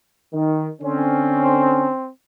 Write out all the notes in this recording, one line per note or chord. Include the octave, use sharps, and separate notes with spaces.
D#3
D3 C4 C#4